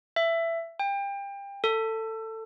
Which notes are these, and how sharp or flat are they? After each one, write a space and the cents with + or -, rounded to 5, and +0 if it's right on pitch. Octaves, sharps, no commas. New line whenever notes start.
E5 +15
G5 +30
A4 +20